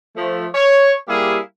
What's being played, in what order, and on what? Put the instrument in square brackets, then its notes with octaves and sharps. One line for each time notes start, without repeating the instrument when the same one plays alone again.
[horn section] F3 A3
C#5
G3 A#3 E4 G4 G#4 F5